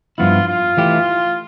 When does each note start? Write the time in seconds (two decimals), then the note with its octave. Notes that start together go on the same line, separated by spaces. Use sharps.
0.18 G2 F3 B3 E4 F4
0.48 F4
0.77 E3 A3 E4 G4